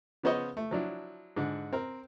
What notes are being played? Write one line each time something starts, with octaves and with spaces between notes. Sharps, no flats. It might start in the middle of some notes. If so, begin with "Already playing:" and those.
C#3 F3 B3 C5 C#5 D#5
A3
F3 F#3 D4 E4
G#2 D3
C4 A#4